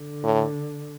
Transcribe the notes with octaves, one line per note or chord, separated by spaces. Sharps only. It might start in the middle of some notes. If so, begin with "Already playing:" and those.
Already playing: D3
A2